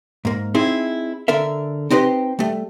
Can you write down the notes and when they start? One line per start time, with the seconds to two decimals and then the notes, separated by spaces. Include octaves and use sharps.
0.25 G#2 A#3
0.54 C4 D#4 E4 G#4
1.28 D3 A4 A#4 E5
1.90 C4 D#4 G4 B4 C5
2.39 G3 A3